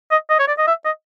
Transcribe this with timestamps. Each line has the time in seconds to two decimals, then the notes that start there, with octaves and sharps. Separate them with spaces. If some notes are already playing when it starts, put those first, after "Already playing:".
0.11 D#5
0.30 D#5
0.39 C#5
0.48 D5
0.58 D#5
0.67 E5
0.85 D#5